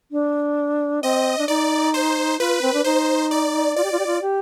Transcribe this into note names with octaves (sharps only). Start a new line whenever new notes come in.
D4
C4 D#5
D4
D#4 D5
C5
F4 B4
C4
D4
D#4 C5
D5
F4 D5
G4
F4
G4
F4
G4